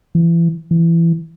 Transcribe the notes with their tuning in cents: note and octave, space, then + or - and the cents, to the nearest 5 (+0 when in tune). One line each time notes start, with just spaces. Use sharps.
E3 +30
E3 +20